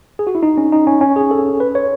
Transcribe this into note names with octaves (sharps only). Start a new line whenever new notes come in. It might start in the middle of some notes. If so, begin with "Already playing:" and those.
G#4
F#4
E4
D#4
C#4
D#4
C#4
C#4
G#4
A4
B4
C#5